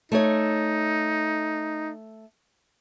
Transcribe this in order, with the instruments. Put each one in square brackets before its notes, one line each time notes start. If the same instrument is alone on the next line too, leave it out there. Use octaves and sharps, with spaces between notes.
[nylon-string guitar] A3 C#5 [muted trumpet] D#4